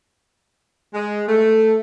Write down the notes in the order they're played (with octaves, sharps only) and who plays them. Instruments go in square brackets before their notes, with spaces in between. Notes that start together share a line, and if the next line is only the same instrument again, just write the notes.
[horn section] G#3
A3